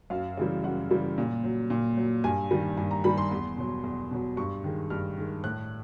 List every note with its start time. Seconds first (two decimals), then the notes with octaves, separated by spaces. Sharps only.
0.10 F#2 F5
0.37 C#3 E3 G3
0.64 F#2 F#5
0.90 C#3 E3 G3
1.18 A#2
1.44 F#3
1.70 A#2
1.97 F#3
2.24 G2 G#5
2.51 D#3 G3
2.77 G2 G#5
2.91 A#5
3.04 D#3 G3 B5
3.17 C6
3.31 E2
3.57 B2 F#3
3.84 E2
4.11 B2 F#3
4.37 G2 C#6
4.64 D#3 G#3
4.90 G2 F6
5.17 D#3 G#3
5.44 A2 F#6